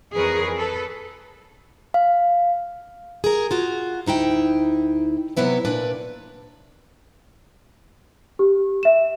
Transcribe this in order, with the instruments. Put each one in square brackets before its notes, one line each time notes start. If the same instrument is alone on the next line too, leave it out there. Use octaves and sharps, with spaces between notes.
[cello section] F2 E3 G#4 A#4 B4 C#5
A4 B4
[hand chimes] F5
[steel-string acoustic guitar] G#4 A#4
F4 F#4
D2 D#4 E4 G5
C3 F#3 B3 E4 B4
A#2 D4 B4
[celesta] G4
E5 E7